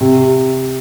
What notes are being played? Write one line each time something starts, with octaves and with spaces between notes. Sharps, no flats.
C3